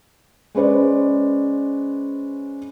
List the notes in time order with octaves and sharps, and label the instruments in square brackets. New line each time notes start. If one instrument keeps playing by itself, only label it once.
[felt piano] G#3 C#4 B4 C5 D5